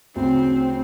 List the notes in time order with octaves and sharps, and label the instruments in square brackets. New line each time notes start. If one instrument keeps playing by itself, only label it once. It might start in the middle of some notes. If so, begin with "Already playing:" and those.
[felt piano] D2 C#3 [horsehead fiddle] C4